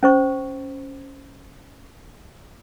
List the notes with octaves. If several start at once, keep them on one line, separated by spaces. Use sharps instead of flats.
C#4 C5 C#6